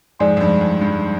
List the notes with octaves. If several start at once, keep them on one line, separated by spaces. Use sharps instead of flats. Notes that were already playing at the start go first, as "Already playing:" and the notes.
F2 G#2 G#4 D5 G#5 C6
F2
G2
F2
G2